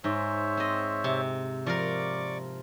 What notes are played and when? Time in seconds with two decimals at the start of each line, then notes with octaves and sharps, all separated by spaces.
0.04 G#2 C5 C#5 E5
0.57 C4 D#5
1.04 C3
1.66 F3 F4 A#4 D5 C#6 D6